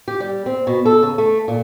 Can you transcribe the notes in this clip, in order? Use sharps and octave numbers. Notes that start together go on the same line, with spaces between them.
G4
G3
C4
B2
A4
C#3
A3
A#2